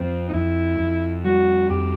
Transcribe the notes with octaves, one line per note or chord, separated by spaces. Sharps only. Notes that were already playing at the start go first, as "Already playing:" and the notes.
Already playing: F2 C4
D#4
F2 E4
F2
G3 F#4
F2 G4